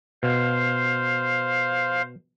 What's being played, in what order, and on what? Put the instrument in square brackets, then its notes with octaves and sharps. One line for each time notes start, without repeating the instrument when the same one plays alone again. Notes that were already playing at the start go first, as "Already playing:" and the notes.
[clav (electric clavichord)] B2 [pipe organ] C5 F5